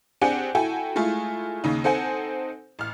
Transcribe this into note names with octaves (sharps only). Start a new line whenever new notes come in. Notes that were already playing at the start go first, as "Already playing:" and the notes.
C4 D4 G4 G#4 F#5 G#5
E4 F#4 A4 G5 G#5
G#3 A3 E4 F4 G#4
D#2 C#3 D#4
C4 D#4 A4 C5 F#5 G#5
A1 F6